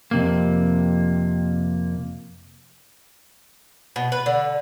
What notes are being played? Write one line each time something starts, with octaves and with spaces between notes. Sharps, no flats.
F2 C3 A#3
B2
B4
D3